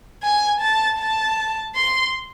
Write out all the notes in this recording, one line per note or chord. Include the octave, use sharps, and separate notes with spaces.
G#5
A5
A5
C6